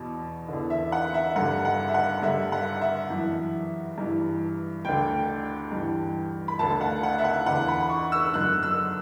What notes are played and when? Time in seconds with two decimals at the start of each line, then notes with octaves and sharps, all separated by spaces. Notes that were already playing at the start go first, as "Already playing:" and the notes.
Already playing: E2 B2
0.49 E2 D3
0.70 E5
0.92 F#5
1.14 E5
1.36 G2 D3 F#5
1.65 F#5
1.89 E5
1.94 F#5
2.22 G2 D3 E5
2.52 F#5
2.81 E5
3.10 F#2 E3
3.98 G2 E3
4.85 D2 D3 G5
5.72 G2 E3
6.48 B5
6.59 D2 D3 A5
6.81 F#5
7.03 F#5
7.19 E5
7.24 F#5
7.46 E2 D3 F#5
7.68 B5
7.90 C#6
8.12 E6
8.34 F#2 D3 F#6
8.63 E6